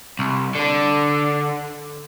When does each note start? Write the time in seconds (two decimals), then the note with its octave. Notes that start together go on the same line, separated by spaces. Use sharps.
0.19 C2
0.55 D3 D4